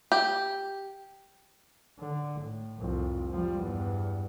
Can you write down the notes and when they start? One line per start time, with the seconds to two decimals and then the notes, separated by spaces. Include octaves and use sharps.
0.12 G4
2.00 D3
2.42 A2
2.79 C2 F2
3.32 F3 G3
3.62 E2 G2